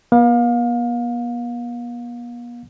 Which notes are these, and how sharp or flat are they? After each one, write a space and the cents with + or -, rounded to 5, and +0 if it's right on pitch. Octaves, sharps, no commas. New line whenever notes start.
B3 -45 F5 +30